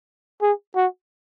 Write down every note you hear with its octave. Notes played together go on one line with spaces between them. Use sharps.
G#4
F#4